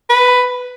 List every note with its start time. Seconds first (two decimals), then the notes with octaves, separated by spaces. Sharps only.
0.09 B4